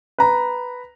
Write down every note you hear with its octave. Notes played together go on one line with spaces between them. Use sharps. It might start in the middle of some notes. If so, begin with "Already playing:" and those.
B4 A#5